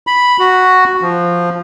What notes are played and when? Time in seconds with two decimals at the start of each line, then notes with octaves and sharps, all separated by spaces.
0.07 B5
0.39 F#4
1.02 F3